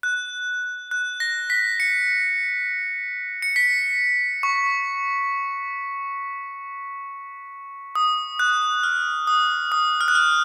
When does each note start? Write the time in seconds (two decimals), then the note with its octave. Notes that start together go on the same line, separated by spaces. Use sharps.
0.03 F#6
0.91 F#6
1.20 A#6
1.50 B6
1.80 C#7
3.42 C#7
3.56 B6
4.43 C#6
7.95 D#6
8.39 F#6
8.83 F6
9.27 D#6
9.72 D#6
10.01 F6
10.08 F#6
10.15 F6